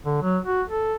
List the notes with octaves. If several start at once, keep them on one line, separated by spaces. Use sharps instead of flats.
D3
F#3
F#4
A4